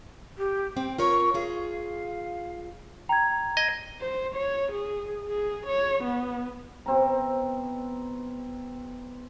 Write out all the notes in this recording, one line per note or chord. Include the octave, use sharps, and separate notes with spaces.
G4
C4 G5
F4 A#4 C#5 C#6
F4 G#4 F5
G5 A#5 G#6
D#5 G#6
C5
C#5
G#4
G#4
C#5
B3
B2 C4 A#5